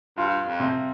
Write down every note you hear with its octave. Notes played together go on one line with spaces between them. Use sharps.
G2 F4
F2
C3